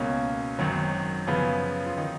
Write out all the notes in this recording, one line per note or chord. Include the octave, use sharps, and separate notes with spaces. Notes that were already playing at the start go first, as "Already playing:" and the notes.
Already playing: C#2 B2 A#3 C#4
G#1 F#2 D#3 F#3
F#2 C#3 F3 B3
F4
D#3 D#4